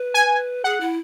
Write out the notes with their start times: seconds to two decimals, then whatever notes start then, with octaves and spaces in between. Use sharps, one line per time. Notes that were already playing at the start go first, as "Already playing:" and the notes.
Already playing: B4
0.14 G#5
0.64 G#4 F#5
0.80 E4